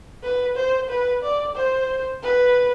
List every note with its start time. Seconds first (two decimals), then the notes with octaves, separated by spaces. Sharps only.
0.23 B4
0.56 C5
0.89 B4
1.22 D5
1.56 C5
2.23 B4